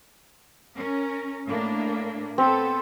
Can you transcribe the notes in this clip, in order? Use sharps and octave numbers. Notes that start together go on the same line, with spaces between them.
C#4 A#4
A2 A#3 D4
B3 C4 A4